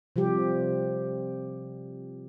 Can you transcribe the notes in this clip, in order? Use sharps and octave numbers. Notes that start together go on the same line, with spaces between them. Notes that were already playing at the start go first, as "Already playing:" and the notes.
C3 F3 G3 G4